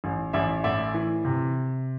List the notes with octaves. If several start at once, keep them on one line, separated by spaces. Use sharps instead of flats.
A1
A1 D5 E5
A2 D5 E5
E3
C3